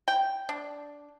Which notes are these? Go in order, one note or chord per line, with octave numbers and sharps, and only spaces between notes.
G5
D4